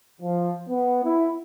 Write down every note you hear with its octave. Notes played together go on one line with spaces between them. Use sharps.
F3
B3
E4